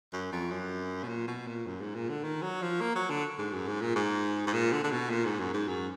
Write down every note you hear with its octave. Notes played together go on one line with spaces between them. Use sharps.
F#2
F2
F#2
B2
A#2
B2
A#2
F#2
G#2
A#2
D3
D#3
F#3
F3
A#3
F#3
D3
G#2
F#2
G#2
A#2
G#2
G#2
A#2
D3
D3
B2
A#2
G#2
F#2
G#2
F#2